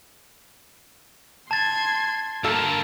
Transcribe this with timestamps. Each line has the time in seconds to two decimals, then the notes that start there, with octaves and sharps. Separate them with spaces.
1.51 A5 C6 G#6 A6
2.44 G2 D3 A#3 A4 A#4